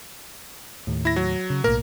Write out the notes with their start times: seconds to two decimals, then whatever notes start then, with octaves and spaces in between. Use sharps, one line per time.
0.87 D#2 A2
1.05 E4 A#6
1.16 F#3
1.50 C#3
1.64 B1 A2 A#3 A#4